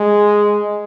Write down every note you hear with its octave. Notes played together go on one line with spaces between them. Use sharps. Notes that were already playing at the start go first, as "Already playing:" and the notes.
Already playing: G#3